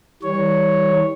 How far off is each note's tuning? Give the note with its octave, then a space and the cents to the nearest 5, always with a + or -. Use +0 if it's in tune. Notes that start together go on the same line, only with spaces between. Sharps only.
E3 -40 G3 +0 C#5 +0